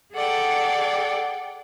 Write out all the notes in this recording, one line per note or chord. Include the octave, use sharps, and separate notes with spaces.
G#4 A4 D5 F#5 G5